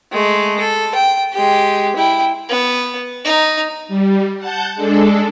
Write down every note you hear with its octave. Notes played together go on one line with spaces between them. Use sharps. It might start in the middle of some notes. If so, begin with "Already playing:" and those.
G#3 A3
A4
G5
G#3 G4
E4 G5
B3
D#4
G3
F#5 A5 G6
G#3 D4 A4